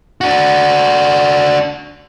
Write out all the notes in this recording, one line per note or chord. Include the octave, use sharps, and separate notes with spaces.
D4 F#4